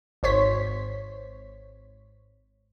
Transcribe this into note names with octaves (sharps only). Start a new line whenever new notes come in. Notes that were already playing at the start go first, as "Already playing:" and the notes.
G#1 C5 C#5 B6